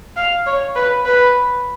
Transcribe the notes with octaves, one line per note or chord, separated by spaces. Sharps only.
F5
C#5
B4
B4